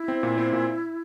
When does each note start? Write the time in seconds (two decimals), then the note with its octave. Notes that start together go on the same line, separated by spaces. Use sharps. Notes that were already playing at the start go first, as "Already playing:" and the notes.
Already playing: E4
0.08 C4
0.23 A#2
0.38 C4
0.53 A#2